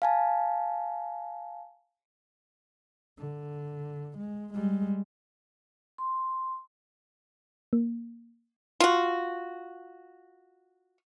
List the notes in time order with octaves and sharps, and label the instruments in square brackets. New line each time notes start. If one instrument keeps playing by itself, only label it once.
[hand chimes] F5 G#5 A5
[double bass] D3
G#3
G3 G#3
[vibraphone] C6
[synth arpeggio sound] A#3
[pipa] F4 F#4